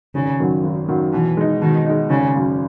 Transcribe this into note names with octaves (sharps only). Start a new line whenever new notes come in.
G#1 C#3
F#2 D#3 F#3
G#1
F#2 D#3 F#3
B2 E3
G#3 D#4
B2 D#3
G#3 D#4
G#1 C#3
F#2 C#3